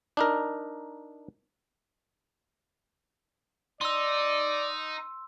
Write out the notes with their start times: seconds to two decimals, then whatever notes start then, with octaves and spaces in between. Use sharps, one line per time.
0.17 D4 D#4 A#4
3.81 D#4 D5 C6 E6